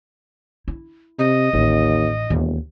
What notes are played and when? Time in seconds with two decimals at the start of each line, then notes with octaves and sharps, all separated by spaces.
0.68 E4
1.19 C3 D#5
1.53 A1 D#2
2.30 E1 D#2